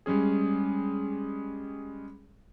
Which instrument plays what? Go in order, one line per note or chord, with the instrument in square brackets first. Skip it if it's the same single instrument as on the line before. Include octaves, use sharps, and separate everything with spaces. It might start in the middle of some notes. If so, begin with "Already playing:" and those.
[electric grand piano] G3 G#3 C#4 G#4